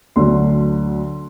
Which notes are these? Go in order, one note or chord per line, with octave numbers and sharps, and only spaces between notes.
D2 D3 F#3 C6